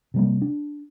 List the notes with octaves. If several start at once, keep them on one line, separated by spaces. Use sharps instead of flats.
C3 G3 A#3
D4